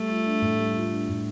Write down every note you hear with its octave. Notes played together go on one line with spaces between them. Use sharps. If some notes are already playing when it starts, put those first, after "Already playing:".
Already playing: G3 A3
F4
D4
A2
G3
F4
D4
A2